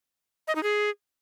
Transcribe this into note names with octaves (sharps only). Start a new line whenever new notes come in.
D#5
D#4
G#4